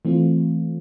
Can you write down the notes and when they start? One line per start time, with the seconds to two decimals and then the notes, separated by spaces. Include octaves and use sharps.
0.05 E3 A3 C4 F4